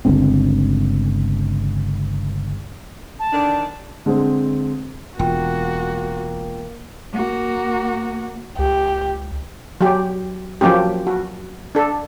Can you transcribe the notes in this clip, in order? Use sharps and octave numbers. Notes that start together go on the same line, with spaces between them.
G1 C#2 D3 C4
A5
D3 D#3 D4
D3 G#3 C4
E1 A#3 F4 F#4 G5
A#3 F#4
C#2 G4
F#3 G4
F3 F#3 A#3 C#4 G4
F#4
D4 A4